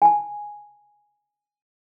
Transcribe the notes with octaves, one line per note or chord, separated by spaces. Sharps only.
G#5 A5